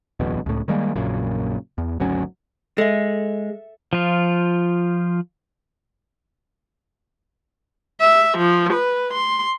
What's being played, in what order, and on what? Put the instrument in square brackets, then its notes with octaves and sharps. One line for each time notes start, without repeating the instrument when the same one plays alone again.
[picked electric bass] D1 B1 E2 B2
C#2 A2
D#3 G3 G#3 A#3
A#1 F#2 A#2 C#3
E2
G#1 D2 F#3 C#4
[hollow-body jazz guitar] G#3 [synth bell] A4 E5
[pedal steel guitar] F3 F4
[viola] E5
F3
B4
C6